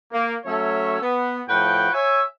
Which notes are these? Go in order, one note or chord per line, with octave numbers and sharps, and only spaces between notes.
A#3
F#3 A3 C#4 A4 C#5 E5
B3
A2 F3 F#4 B4 G5
C#5 E5 G#5